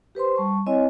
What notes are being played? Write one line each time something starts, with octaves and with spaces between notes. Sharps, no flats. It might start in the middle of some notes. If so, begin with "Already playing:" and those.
G4 B4 C5 C6
G3 A5 C#6
C4 E4 C#5 D#5 G#5